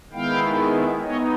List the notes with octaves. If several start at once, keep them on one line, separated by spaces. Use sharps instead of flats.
D#3 G#3 B3 E4 F5 G5
B3 D#4 C#5 D#5